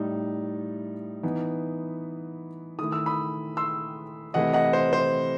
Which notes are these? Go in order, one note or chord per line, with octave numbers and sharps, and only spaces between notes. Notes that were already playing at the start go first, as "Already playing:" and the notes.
Already playing: A2 G3 D#4
E3 B3 D#4
D#3 A3 E4 D#6
E6
B5 D#6
C6 E6
C3 E3 A3 E4 D#5 F#5
D#5 F#5
C5
C5